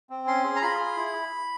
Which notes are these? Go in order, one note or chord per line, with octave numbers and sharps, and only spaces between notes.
C4
C#4 C6
G#4
A#5
F4 B5
G#4
E4